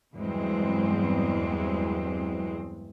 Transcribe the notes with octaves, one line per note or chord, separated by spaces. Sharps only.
E2 G2 F#3 G#3 C4